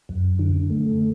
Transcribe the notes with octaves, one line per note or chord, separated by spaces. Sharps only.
F#2
D3
A3